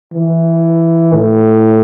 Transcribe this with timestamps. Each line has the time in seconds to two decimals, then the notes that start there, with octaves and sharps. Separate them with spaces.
0.14 E3
1.14 A2